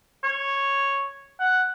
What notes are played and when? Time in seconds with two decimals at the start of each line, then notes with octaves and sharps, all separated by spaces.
0.24 C#5
1.40 F#5